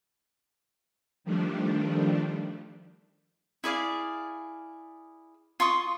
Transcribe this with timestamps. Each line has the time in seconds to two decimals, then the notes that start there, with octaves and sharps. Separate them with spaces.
1.24 D#3 F3 G3 A3 D4
3.64 E4 G#4 D5 F5
5.60 F4 C6 C#6 D#6